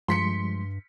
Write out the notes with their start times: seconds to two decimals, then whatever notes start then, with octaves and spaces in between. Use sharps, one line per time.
0.08 G2 F3 G3 G#3 C6 B6 C#7